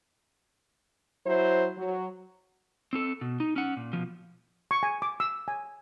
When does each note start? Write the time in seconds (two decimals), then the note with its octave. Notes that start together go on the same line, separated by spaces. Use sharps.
1.26 F#3 E4 C5
1.78 F#3
2.93 C4 A4
3.21 B2
3.40 D#4
3.56 C#4 F#5
3.77 A#2
3.93 B2 F3
4.71 C#6
4.83 G#5
5.02 D6
5.20 E6
5.48 G#5